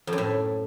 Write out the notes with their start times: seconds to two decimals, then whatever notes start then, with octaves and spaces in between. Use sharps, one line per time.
0.07 F2
0.13 F#2
0.18 A2